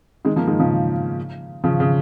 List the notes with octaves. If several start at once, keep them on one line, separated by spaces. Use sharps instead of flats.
D#3 G#3
F3 A#3
D#3 G#3
C#3 F3
C#3 F3
C#3